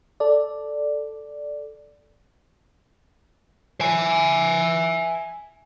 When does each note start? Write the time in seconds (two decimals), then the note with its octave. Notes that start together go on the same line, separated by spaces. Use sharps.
0.20 A4 D5
3.81 E5 G#5